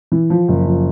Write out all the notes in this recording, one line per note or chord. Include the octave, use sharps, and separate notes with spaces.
E3
F3
F#1
F3